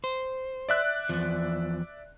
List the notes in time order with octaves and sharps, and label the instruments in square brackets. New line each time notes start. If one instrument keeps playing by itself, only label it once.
[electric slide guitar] C5
[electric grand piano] D5 E5 F#6
[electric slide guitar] E2 F3